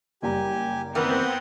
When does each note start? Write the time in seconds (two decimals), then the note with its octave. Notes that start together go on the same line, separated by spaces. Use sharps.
0.22 F#1 G3 G4 G#5 A#5
0.95 D#3 E3 B3 C4 A#4 F#5 G5 D#6